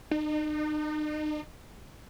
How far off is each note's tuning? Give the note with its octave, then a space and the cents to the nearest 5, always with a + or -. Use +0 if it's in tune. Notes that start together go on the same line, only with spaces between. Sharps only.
D#4 -40